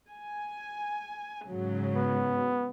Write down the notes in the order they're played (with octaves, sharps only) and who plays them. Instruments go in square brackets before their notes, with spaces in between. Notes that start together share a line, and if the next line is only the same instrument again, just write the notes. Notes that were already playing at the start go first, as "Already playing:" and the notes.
[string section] G#5
G#2 C#3 F#3
[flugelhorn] B3